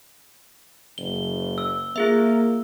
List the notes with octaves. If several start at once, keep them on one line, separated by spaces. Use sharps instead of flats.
F#1 G7
E6
A#3 F4 G#4 E5